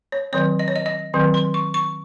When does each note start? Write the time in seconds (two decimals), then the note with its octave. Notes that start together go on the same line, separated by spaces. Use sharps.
0.12 C#5
0.33 D#3 F#3 C4 C#5
0.59 D#5
0.68 C#5
0.76 D#5
0.86 D#5
1.14 D#3 F#3 C4
1.34 C6
1.54 C#6
1.74 C#6